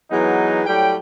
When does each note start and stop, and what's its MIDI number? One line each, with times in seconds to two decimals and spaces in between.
0.10 0.61 52
0.10 0.61 54
0.10 0.61 56
0.10 0.61 59
0.10 0.61 63
0.66 0.95 45
0.66 0.95 54
0.66 0.95 55
0.66 0.95 79